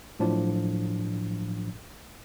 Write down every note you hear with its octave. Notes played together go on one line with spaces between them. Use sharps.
A2 F3 F#3 D4